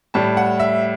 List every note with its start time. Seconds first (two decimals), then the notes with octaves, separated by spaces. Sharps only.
0.14 A2 G3 A5
0.37 F#5
0.60 E5